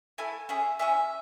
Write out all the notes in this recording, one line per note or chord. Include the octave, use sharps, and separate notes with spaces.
A3 E4 A4 G#5
C#4 E4 G#4 E5
C#4 E4 G#4 E5